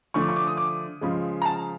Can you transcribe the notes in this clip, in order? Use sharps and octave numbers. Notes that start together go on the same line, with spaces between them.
D3 F3 A3 C#6
D6
C#6
D6
D#6
D6
C#3 F3 G#3
A#5
A5